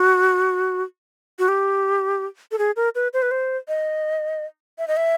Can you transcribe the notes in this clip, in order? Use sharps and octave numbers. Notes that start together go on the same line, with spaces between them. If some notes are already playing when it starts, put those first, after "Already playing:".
Already playing: F#4
F#4
G4
A4
G#4
A#4
B4
C5
B4
C5
D#5
E5
D#5
E5